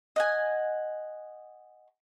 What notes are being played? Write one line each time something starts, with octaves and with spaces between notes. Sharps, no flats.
D#5 F#5 G#5